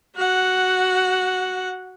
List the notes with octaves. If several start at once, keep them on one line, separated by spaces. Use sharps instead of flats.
F#4 F#5